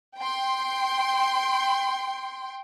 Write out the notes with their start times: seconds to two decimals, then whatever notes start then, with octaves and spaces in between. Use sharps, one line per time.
0.17 G5 C6